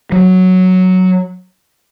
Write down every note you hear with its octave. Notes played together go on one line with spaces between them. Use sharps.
F#3